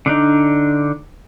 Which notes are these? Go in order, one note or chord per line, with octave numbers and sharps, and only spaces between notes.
D3 D4 D#4